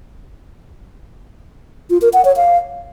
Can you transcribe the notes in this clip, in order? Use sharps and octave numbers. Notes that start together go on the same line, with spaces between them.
F4
A#4
F#5
C#5
F5